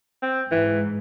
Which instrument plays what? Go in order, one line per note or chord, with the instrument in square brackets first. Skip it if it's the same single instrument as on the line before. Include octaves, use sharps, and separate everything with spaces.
[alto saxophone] C4
[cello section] G#2 [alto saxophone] E3